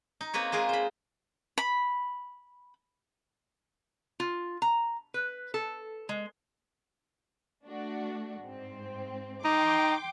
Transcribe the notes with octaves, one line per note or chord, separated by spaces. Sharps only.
D#4
A#3 C4 B4 C#5
G#3 F4 G#4 A#4
C5 B5
B5
F4
A#5
B4
A4
G#3
A3 D4 F#4
G#2 C4
D#4 G5 C6 D6